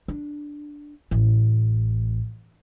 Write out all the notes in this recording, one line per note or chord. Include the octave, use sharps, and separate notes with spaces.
D4
A1